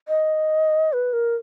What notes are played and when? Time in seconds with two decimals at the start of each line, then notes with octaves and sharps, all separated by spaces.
0.08 D#5
0.93 B4
1.13 A#4